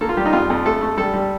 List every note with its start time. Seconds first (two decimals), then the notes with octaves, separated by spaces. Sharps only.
0.01 A#3 A4
0.09 F4
0.17 G3 G4
0.25 D#4
0.33 F2 F4
0.50 F2
0.65 A3 A4
0.81 A3
0.97 G3 A4
1.14 G3